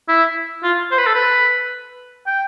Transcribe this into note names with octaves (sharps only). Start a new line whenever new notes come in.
E4
F4
C5
B4
A4
B4
G5